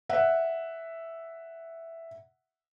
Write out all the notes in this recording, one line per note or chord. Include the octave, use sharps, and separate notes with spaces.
E5 F#5